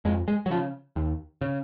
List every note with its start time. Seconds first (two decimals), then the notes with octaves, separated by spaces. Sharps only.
0.05 F2 G#3
0.28 G#3
0.46 F#3
0.50 C#3 F3
0.96 D#2
1.41 C#3